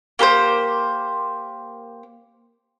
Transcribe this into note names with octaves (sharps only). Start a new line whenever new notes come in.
A#3 G4 A#4 C5